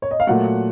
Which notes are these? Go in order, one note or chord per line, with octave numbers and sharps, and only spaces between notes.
C#5
D#5
F5
A#2 F#3 A3 F#5